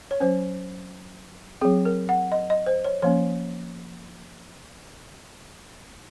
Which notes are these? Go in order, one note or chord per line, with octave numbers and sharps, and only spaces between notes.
C#5
F#3 C#4 C5
F#3 C4 G#4
A#4
F#5
D#5
D#5
C5
C#5
F3 A#3 C#4 C#5